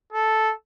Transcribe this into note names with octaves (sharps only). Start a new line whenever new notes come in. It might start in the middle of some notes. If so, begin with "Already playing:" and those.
A4